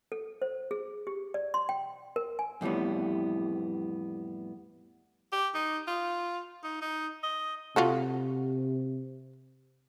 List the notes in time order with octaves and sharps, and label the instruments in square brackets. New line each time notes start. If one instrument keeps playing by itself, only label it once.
[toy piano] A4
C5
G#4
G4
D5
C6
G5
A#4
G#5
[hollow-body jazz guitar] F2 A2 E3 G3 B3
[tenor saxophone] G4
D#4
F4
D#4
D#4
D#5
[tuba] C3 [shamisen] F4 F#4 A4